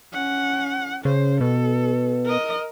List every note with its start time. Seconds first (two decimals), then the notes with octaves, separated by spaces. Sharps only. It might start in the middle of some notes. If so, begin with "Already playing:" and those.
0.13 C#4 F#5
1.05 C#3 C5
1.41 B2 A4
2.25 A#4 D#5